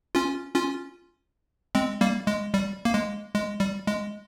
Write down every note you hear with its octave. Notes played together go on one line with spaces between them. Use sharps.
C#4 F4
C#4 F4
G#3 C4
G3 A#3
G#3
G3
A#3
G#3
G#3
G3
G#3